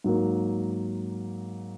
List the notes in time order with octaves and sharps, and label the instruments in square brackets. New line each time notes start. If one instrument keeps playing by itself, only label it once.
[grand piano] G#2 F#3 A#3